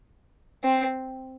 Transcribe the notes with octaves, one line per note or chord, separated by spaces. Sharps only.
C4